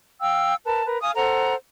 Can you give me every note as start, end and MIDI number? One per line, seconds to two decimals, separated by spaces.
0.21 0.55 77
0.21 0.55 79
0.21 0.55 88
0.65 0.83 70
0.65 0.83 71
0.65 0.83 81
0.85 1.00 70
0.85 1.00 71
1.02 1.11 77
1.02 1.11 80
1.02 1.11 87
1.16 1.54 69
1.16 1.54 72
1.16 1.54 78
1.16 1.54 82